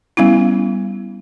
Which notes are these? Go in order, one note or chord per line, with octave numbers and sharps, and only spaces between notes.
G3 B3 C#4 E4